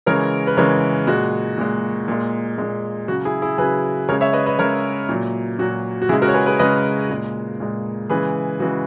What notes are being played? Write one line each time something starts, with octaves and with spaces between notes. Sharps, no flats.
C#3 E3 G#3 A#4 C#5
B4
C#3 E3 G#3 A#4 C#5
A#2 G#3 F#4
A#2 G#3
A#2 G#3
A#2 G#3
C#3 F#3 F#4
E4 G#4
E4 G#4
C#3 F#3 G#4 B4
C#3 G#3 A#4 C#5
C#5 E5
B4 D#5
B4 D#5
C#3 G#3 A#4 C#5
A#2 F#3
A#2 F#3 F#4
F#4
C#3 G#3 E4 G#4
F#4 A#4
C#5
G#4 B4
G#4 B4
C#3 G#3 B4 D#5
A#2 G#3
A#2 G#3
C#3 E3 G#3 G#4 B4
C#3 E3 G#3 F#4